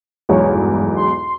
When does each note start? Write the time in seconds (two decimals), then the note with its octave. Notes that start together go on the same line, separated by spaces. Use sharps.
0.29 B1 E2 G#2 C#5
0.55 G2
0.97 C6